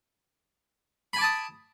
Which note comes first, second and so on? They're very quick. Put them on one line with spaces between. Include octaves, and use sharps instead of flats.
B5 G#5 D6 A5 D#6